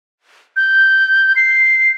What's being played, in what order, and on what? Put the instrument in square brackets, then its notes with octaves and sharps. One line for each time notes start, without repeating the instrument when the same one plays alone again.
[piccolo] G6
C7